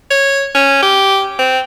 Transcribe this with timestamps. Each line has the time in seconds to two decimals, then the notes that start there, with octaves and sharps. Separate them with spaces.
0.10 C#5
0.55 C#4
0.82 G4
1.39 C4